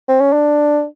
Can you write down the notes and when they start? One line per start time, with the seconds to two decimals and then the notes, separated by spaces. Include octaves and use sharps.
0.08 C4
0.21 C#4
0.33 D4